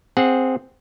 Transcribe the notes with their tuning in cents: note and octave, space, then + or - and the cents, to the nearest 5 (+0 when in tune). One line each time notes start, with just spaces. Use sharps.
C4 -5 G#4 -5 F#5 -15